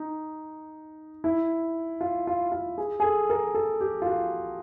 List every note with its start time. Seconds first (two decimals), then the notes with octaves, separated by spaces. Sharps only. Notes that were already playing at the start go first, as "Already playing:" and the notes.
Already playing: D#4
1.24 E4
2.01 F4
2.27 F4
2.52 F4
2.78 G#4
3.00 G#4
3.04 A4
3.30 A#4
3.54 A4
3.81 G4
4.02 F4
4.06 F#4